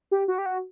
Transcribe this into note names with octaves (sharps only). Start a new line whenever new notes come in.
G4
F#4
G4
F#4